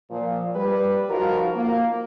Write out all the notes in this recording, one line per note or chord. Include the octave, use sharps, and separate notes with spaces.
A#2 F3
G3 B4
F3 D#4 F4 F#4 A#4
A#3